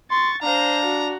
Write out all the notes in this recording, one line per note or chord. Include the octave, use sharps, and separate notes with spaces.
C6 C#6 A6
D4 C5 F5 A#5
F#4